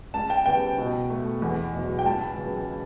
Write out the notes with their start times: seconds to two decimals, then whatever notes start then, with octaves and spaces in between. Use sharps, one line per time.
0.14 C#2 A5
0.30 G5
0.46 C#3 G3 B3 G5
0.78 B2
1.10 A3
1.42 E2
1.73 B2
1.79 F#3
1.99 G5
2.05 C#2 A5
2.37 C#3 F#3 B3